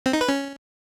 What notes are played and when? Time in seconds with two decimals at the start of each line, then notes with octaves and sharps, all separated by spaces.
0.06 C4
0.13 D#4
0.21 B4
0.28 C#4